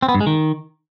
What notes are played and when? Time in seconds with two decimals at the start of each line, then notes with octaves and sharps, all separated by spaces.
0.02 C4
0.09 B3
0.15 G2
0.21 G#3
0.27 D#3